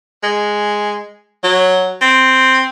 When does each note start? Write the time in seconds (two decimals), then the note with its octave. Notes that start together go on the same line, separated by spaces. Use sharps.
0.23 G#3
1.44 F#3
2.01 C4